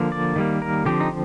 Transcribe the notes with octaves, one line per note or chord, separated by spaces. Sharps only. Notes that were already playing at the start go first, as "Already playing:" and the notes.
Already playing: D3 F3 A#3
D5
D#3 G3 A#3
A#4
D3 F3 C4 G4
D#4